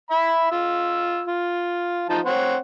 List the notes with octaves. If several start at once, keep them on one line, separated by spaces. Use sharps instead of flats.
E5 B5
F4 E6
F4
F3 D#4 A5
C4 C#5 F#5